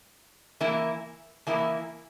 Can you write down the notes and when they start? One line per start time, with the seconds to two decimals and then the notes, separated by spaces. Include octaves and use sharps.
0.60 E3 A#3 E4
1.47 E3 A#3 E4